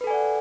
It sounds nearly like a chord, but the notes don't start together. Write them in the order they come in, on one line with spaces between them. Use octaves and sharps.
B4 A4 G#5 D5 F#5